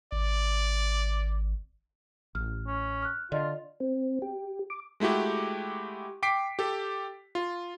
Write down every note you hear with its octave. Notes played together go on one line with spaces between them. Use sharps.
G#1 D5
A1 F6
C#4
F6 F#6
D3 F4 D5 D#5
C4
G4
D6
G#3 A3 E4 F#4 G4
G5 D6 B6 C7 D7
G4 A4
F4